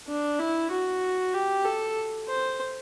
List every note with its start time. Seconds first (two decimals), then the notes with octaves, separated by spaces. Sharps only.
0.08 D4
0.39 E4
0.71 F#4
1.34 G4
1.65 A4
2.28 C5